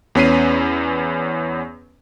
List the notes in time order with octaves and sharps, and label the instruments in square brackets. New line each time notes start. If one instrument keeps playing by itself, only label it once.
[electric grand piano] E2 B3 C#4 B6 C7 D#7